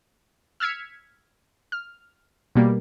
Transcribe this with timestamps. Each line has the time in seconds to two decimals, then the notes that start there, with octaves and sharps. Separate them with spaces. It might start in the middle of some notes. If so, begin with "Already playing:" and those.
0.60 E6 F6 G#6 B6 C#7
1.72 F6
2.55 B2 G3 A#3